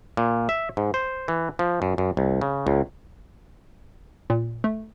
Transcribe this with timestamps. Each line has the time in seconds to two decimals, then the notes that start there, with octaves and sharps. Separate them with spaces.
0.17 A#2
0.49 E5
0.77 G#2
0.94 C5
1.28 E3
1.59 F3
1.82 F#2
1.98 F#2
2.17 C2
2.41 C#3
2.67 C#2
4.30 A#2
4.64 A3